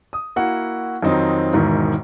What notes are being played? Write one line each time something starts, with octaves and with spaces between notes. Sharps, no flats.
D#6
A#3 E4 F#4 F#5
F2 D#3 F#3 C4 D#4
E1 E2 G#2 B2 D#3